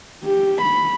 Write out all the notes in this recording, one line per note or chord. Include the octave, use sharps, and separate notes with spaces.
G4
B5